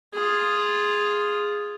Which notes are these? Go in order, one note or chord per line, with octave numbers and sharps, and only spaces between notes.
F4 G#4